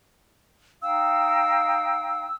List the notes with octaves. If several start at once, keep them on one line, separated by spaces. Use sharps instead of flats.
D#4 F5 G5 E6